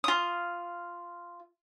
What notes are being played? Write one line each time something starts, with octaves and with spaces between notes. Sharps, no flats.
F4 D#6